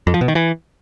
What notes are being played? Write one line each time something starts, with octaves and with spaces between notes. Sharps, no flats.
F2
F3
B2
D#3
E3